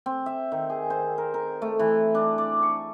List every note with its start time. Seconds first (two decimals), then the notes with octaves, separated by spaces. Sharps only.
0.06 C4
0.26 E5
0.52 D#3
0.70 G#4
0.90 C5
1.18 A#4
1.34 A#4
1.62 A3
1.79 E3
2.15 D4
2.38 D5
2.63 C#6